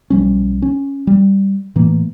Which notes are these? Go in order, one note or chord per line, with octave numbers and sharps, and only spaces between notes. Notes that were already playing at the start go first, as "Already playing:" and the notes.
B1 F3 G3 C#4
C#4
G3
A2 E3 A3 A#3